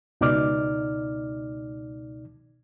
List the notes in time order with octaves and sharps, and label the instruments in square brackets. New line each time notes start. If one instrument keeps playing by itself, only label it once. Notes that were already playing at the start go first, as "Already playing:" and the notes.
[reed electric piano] C#2 B2 D#4 D5 D6 F6